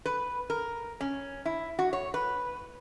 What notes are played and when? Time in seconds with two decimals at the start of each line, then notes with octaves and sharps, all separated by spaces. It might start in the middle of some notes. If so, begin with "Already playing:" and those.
0.06 B4
0.50 A#4
1.01 C#4
1.45 E4
1.79 F#4
1.93 C#5
2.14 B4